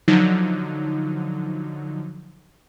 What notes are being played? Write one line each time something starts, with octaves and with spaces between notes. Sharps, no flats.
D3 F3 F#3 D#4